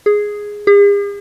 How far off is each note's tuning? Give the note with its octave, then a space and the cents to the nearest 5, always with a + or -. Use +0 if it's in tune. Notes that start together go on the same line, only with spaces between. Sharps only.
G#4 +0
G#4 -45